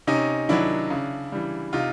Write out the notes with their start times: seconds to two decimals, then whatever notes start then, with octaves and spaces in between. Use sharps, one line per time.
0.07 C3 C#4 D#4
0.49 D#3 F#3 D4 E4
0.90 C#3
1.32 E3 G3
1.73 C3 D#4 F4